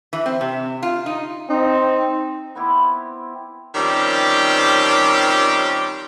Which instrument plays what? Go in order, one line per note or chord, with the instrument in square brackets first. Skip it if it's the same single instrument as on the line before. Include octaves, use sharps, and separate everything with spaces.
[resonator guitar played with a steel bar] E3
C4
C3
F4
D#4
[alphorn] C4 [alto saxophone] D#4
[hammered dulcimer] B3 C4 E4 G4
[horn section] D#3 F3 G3 C4 C#4 G4